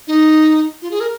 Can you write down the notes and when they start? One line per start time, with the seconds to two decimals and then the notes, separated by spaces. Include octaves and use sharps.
0.07 D#4
0.82 F4
0.91 G#4
1.00 A#4